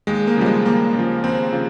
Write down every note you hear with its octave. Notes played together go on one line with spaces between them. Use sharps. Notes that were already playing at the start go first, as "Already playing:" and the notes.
D#2 G#3
A#3
C#3 F3 G3
G#3
D#2 A#3
C#3 F3
D#2 C4
C#3 F3